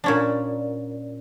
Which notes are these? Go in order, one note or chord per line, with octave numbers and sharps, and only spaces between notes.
A#2 C#4 D4